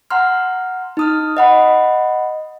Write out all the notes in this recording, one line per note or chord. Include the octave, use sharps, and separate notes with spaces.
F#5 A#5 C6 F6
D#4 D#6 F6
D#5 F#5 B5